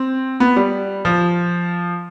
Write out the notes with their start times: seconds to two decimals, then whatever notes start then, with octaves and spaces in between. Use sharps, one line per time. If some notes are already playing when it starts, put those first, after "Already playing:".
Already playing: C4
0.40 B3
0.56 G3
1.05 F3